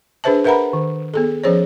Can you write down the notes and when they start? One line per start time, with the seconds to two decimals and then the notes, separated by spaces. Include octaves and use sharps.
0.24 D4 G#4 B4 C5 E5 A5
0.44 A#4 B4 E5 F#5 A#5 B5
0.73 D#3
1.14 B3 G#4 A4
1.44 F3 C#4 G#4 C5 C#5